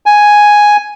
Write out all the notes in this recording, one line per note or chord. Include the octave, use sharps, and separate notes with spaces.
G#5